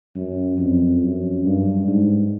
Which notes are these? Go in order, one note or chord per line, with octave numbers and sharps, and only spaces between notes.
F#2
F2
F#2
G2
G#2